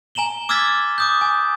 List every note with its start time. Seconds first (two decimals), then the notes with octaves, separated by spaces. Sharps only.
0.15 G#5 A#5 E7 F#7 G7
0.49 D6 E6 F6 G#6 A6 B6
0.98 D6 D#6 G6
1.21 G#5